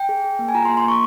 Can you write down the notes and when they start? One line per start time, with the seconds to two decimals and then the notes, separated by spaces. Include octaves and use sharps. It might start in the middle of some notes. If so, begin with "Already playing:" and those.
Already playing: G5
0.09 G#4
0.24 G#4
0.39 A#3
0.49 G#5
0.54 F4 A#5
0.65 C6
0.69 A#3
0.77 C6
0.85 A#3 C#6